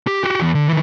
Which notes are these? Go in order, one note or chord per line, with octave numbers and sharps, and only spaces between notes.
G4
F#4 G4
E2
D3
D#3 E3